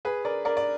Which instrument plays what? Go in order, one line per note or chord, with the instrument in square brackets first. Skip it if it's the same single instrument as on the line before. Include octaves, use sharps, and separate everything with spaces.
[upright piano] G#4 B4
A#4 D5
A#4 D5
D5